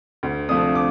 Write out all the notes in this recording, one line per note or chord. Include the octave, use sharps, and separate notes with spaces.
D2
C3 F3 A3 D4 D#6
D6